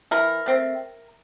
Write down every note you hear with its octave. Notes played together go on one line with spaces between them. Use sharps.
E3 A#4
A3 C4